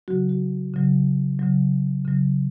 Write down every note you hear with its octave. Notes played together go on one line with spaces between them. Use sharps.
C#3 F#3 F#4
F#4
C#3 F#3
C#3 F#3
C#3 F#3